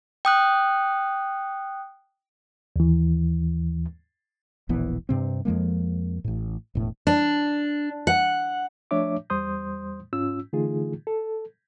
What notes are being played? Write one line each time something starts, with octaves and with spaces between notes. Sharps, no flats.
G5 D#6 F#6
D#2 E3
E1 A#1 E3 B3
G2 C3 C4
F2 F3 G#3 A#3
A1 A2
E1 A2
D4
F#5
F3 A3 D4 C#5 E5 D6
E2 G3 C5 C6 D#6 G6
G#2 C#4 F4 E6
D3 E3 A3 D#4 F4 G#4
A4